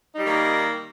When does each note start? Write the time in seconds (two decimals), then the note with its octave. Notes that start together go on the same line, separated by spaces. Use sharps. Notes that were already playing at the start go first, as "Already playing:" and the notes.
0.15 D#4
0.18 G3
0.21 A#3
0.25 D#3